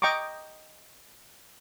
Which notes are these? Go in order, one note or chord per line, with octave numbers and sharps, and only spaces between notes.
D#5 G5 A#5 C#6 D6